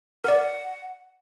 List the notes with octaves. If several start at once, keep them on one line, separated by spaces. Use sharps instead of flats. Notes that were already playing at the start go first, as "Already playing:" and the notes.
A#4 D5 F#5